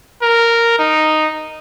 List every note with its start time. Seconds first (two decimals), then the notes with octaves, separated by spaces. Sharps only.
0.22 A#4
0.79 D#4